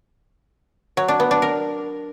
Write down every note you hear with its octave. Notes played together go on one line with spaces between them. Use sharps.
F#3
D4
B3
D4
A#4